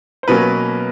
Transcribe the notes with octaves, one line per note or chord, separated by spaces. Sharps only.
C5
B2 F#3 A#3 C#4 B4